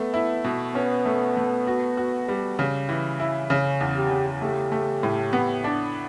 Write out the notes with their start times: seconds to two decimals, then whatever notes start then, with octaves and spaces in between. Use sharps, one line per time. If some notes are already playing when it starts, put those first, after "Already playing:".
Already playing: A3 B3
0.14 E4
0.44 B2
0.75 B3 C#4
1.05 A3
1.37 A3
1.67 F#4
1.97 F#4
2.28 G3
2.59 C#3
2.89 E3
3.20 E4
3.50 C#3 C#4
3.81 E2
3.96 G4
4.11 C#3
4.42 A3 G4
4.72 A3
5.03 A2
5.33 B3
5.64 D4